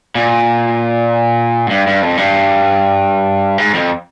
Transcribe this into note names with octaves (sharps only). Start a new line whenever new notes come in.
A#2
G#2
G2
G2
F2
G2
G#2
F2